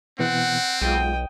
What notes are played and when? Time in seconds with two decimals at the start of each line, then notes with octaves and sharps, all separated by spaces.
0.19 B2 E3 B3 C4 F#5
0.81 B1 G#3 F4 G5 D#6